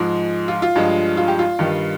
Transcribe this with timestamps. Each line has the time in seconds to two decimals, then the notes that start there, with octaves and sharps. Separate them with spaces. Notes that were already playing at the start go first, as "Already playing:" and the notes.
Already playing: G#2 F3 G#3
0.48 F4
0.62 F4
0.76 G2 F3 G#3
1.17 F4
1.28 G4
1.39 F4
1.59 G2 D#3 G3